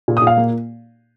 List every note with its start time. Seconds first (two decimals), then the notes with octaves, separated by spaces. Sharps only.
0.08 A#2
0.17 D#6
0.22 A#2
0.27 F5
0.37 A#3